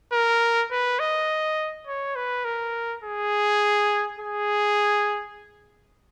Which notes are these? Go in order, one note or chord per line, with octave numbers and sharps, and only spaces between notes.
A#4
B4
D#5
C#5
B4
A#4
G#4
G#4